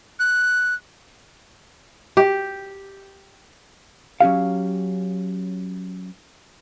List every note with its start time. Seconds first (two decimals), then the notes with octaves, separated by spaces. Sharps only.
0.19 F#6
2.17 G4
4.20 F#3 C#4 G4 F5